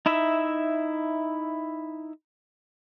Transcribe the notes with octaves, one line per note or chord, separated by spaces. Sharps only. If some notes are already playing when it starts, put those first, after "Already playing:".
D#4 E4 E5